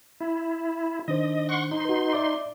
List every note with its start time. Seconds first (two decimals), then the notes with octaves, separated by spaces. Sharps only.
0.21 E4
1.08 D#3 D4 C5 D#5
1.49 F#5 C6 C#6
1.71 D#4 C6
1.85 F#4 B4
2.13 D5 E5 D6